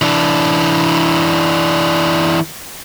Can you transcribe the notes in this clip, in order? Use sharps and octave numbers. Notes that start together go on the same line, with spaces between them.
E3 D4